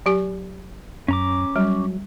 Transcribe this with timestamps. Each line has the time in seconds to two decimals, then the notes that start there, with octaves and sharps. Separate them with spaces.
0.06 F#3 G4 G#5
1.08 F#2 C#4 A#5 D6
1.56 F#3 G3